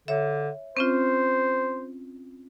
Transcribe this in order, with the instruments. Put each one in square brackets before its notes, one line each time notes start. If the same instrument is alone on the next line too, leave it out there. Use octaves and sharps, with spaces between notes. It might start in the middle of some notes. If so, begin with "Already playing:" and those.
[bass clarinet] D3 [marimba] C#5 E5
[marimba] C4 C#4 F4 [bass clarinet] C5